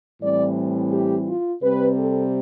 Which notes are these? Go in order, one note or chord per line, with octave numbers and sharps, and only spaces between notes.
A2 E3 G3 C4 D5
G4
F4
C3 G3 C4 B4
A4